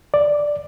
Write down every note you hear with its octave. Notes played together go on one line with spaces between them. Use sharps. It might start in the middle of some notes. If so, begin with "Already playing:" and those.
D5